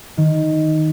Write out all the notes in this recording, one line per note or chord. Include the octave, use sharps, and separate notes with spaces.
D#3